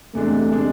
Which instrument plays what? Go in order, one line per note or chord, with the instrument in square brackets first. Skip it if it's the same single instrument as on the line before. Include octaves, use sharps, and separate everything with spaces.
[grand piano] E2 C3 G#3 D4 [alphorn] A3
[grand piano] C3 G#3 D4